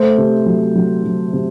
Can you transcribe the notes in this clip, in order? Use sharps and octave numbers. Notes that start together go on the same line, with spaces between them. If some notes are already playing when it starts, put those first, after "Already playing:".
Already playing: A3 C5
C3
F#3
F#3
F#3
C3